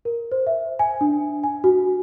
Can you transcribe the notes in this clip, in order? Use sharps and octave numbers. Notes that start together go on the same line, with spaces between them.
A#4
C5
E5
G#5
D4
G#5
F#4